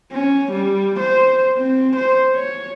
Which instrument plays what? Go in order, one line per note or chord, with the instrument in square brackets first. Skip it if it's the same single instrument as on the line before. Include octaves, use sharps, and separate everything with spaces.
[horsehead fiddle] C#4
G3
C5
C4
C5
C#5